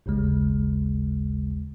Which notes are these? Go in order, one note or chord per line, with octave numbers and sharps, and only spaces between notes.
A1 D#2 C#3 G#3